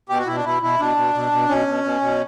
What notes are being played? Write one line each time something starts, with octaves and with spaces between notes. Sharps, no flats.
B2 G4
F#4
B2 E4
D4
B2 E4
B2 E4
B2 D4
B2
B2
B2
B2 C#4
B2
B2
B2